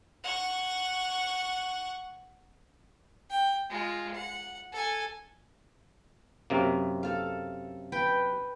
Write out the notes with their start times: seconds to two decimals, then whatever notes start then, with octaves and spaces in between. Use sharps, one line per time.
0.24 F#5 C#6
3.30 G5
3.69 G#3 F4
4.14 F#5
4.72 A4 G#5
6.50 F#2 C3 A#3
7.03 A4 F5
7.92 B4 G5